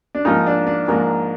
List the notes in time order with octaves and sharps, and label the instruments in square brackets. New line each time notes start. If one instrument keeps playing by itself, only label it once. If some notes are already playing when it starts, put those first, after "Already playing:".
[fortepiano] D4
G#2 F3 A#3 D#4
D4
D4
G#2 F3 A#3